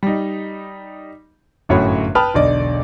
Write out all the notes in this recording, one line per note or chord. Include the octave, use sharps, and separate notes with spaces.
G3 D#4
G1 F#2 A2 F#4 C#5 B5
B4 G5 A5 B5 D#6 F6
E1 B1 D3 D5 D#5